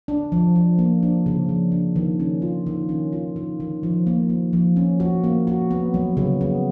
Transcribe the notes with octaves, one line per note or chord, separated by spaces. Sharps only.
D4
F3
F3
A#3
D4
C#3
F3
D4
D#3
C#4
F4
D#3
C#4
F4
D#3
D#3
F3
A#3
A#3
F3
C#4
F#4
A#3
F#4
B3
F#3
C#3
B3